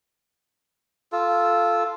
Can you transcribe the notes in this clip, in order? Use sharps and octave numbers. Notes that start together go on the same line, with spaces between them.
F4 A4